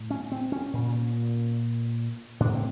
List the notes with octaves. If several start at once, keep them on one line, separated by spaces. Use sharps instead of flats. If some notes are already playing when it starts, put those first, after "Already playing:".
Already playing: A2
C#4
C4
C#4
A#2
A2 D4
C4